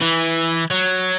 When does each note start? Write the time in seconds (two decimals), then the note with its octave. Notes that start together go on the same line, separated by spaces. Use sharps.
0.02 E3
0.71 F#3